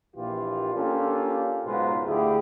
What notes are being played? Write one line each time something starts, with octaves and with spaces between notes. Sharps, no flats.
A#1 A#2 E3 F4 G4
A#3 C#4 D4 F4 G4 A4
B1 G#2 C#3 F#3 F4 B4
D2 A3 E4 G4 G#4